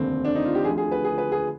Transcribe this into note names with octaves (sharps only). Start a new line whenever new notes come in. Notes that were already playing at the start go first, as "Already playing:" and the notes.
Already playing: F1 D#2 D3 C4
D4
D#4
F4
G4
D2 D3 F3 G#4
G#4
B4
G#4
B4
G#4